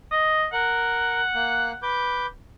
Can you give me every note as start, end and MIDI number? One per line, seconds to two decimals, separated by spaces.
0.12 0.46 75
0.53 1.21 70
0.53 1.83 78
1.35 1.72 58
1.35 1.72 90
1.82 2.26 71
1.82 2.26 86
1.82 2.26 91